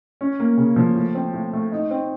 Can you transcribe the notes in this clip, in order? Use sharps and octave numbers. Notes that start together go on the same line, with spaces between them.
C#4
A#3
C#3
F3
A2
C4
A2
A3
D#4
C4